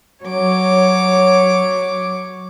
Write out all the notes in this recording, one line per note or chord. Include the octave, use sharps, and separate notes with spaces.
F#3 C#5 D6